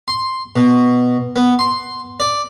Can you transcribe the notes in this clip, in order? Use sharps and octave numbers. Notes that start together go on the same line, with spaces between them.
C6
B2
B3
C6
D5